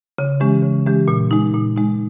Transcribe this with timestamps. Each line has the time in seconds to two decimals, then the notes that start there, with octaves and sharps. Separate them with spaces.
0.19 C#3
0.40 E3 G#3 C#4 G4
0.63 C#3
0.86 E3 G#3 C#4 G4
1.08 A#2
1.31 G#3 D#4
1.54 A#2
1.76 G#3 D#4